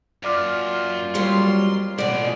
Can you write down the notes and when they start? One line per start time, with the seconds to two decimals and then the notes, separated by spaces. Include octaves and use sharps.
0.23 F#2 A#3 F4 D5 D6 F6
1.15 F2 F#3 G3 C6
1.98 B2 F3 G#4 D5